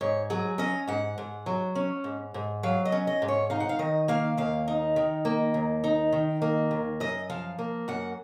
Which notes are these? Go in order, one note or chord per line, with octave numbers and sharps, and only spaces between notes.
G#2 C#5
F#3 G#4
C#4 D#5
G#2 F#5
G#2
F#3
C#4
G#2
G#2
F#3 F5
D#5
C#4
D#5
G#2
C#5
D#4 F5
F#5
F5
D#3 D#5
A#3 F5
D#2 F5
D#4
D#3
A#3
D#2
D#4
D#3
A#3
D#2
F#2 D#5
F3 F5
A#3
F#2 F#5